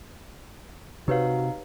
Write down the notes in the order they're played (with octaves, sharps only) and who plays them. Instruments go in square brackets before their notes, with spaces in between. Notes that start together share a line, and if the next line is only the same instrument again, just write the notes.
[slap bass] C3 [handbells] D#4 F5 [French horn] F#4 [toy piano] G4 B4 C#5